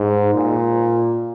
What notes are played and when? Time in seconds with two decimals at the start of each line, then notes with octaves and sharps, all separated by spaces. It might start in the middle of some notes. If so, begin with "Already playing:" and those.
Already playing: G#2
0.34 A#2